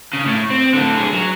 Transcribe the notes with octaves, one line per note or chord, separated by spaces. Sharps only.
C#3
A2
C4
A2 D3
F#2 G#4
F#3